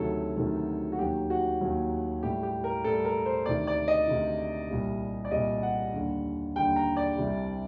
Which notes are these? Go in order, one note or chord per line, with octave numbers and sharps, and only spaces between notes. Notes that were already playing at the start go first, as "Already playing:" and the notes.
Already playing: D2 C3 D#3 F#3 A4
D2 C3 D#3 F#3
F#4
D#2 D#3 F#3 G4
F#4
D#2 D#3 F#3
A2 G3 G4
G4
A#4
A2 G3 A4
A#4
C5
D2 C3 D#3 D5
D5
D#5
D2 C3 D#3
C2 A#2 G3
D5
C2 A#2 G3 D#5
F#5
D#2 D3 G3
D#2 D3 G3 G5
A#5
D5
C2 C3 G3